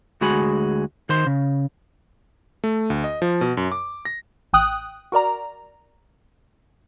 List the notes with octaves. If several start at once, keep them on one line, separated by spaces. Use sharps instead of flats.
D2 G#3 F#4 G#4 B5
D#3 C5 C6
C#3
A3
D2
D#5
F3
B2
F#2
D6
A#6
A1 G5 D#6 F#6
F#4 A#4 D5 A#5